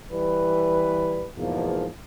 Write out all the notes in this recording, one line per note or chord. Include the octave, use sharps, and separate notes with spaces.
E3 G3 B4
E2 G#2 B2 F3 A#3